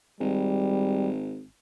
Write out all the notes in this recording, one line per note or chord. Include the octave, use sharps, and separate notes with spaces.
G#1 G3